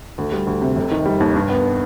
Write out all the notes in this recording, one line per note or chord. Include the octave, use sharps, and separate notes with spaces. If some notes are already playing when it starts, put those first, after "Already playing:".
D2
G3
D2
C3
F1
D#3
G3
D#2
G2
B3